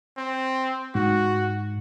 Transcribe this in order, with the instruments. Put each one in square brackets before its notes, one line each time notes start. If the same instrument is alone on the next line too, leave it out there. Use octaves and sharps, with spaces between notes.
[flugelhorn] C4
[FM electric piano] G#2 [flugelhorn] F#4